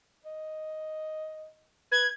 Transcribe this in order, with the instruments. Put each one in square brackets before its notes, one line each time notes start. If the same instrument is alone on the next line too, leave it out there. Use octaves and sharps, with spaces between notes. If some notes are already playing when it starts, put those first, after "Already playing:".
[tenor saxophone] D#5
[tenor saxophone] B4 [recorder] G#6